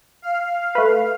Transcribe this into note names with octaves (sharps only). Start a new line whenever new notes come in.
F5
A3 B4